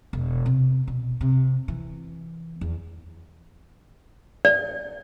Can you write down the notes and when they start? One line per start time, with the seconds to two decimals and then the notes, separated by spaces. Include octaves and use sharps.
0.13 E1
0.46 C3
0.88 B2
1.21 C3
1.68 E3
2.61 E2
4.45 D5